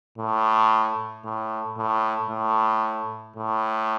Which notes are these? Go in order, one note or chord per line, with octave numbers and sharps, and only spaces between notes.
A2
A2
A2
A2
A2